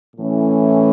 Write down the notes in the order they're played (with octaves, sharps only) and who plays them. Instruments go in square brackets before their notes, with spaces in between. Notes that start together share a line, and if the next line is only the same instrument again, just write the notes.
[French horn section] A2 E3 A3 C#4